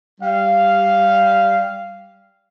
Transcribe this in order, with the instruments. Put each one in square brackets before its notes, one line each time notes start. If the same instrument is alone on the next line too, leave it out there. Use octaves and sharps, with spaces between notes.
[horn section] G3 F5